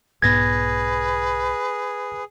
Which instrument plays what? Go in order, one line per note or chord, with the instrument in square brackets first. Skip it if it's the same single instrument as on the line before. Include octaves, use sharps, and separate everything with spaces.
[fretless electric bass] B1 G#2 B3 [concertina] G#4 [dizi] B4 [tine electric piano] G#6 A#6